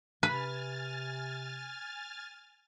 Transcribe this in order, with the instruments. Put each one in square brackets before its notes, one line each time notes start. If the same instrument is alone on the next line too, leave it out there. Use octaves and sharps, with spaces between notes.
[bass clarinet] C3 [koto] B4 [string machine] G#5 F6 A6